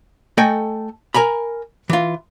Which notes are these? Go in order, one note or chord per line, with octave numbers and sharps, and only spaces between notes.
A3 A4 D#5 G5 G#5
A#4 G#5 A#5 B5
E3 F4